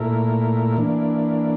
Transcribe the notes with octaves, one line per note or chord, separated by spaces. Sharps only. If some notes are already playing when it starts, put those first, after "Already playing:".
Already playing: A#2 A3 E4 A#4
E3 A#3 D4